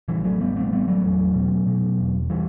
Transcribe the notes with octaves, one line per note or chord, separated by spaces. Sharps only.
A1 E3 G3
F#3 A3
A1 G3 B3
A3 C4
A1 G3 B3
F#3 A3
E2
B2
B2
E1
E3 G3